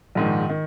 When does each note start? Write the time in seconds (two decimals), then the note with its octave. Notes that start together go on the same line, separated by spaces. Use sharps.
0.15 A#1 G#2 D#3
0.49 D#3